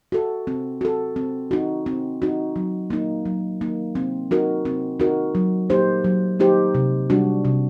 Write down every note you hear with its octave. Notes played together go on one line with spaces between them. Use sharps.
F#4 A4
C4
F#4 A4
C4
D#4 F#4
C4
D#4 F#4
F#3
A#3 D#4
F#3
A#3 D#4
C4
D#4 F#4 A#4
C4
D#4 F#4 A#4
F#3
A#3 D#4 G4 C5
F#3
A#3 D#4 G4 C5
C3
G3 D4 F#4
C3